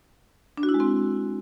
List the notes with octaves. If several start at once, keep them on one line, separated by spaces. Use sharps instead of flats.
D4
F#4
E4
G#3
C4